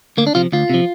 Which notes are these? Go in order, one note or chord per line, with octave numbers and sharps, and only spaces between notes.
D2 A#3
D4
C3 F3 F4
D2 F4
C3 F3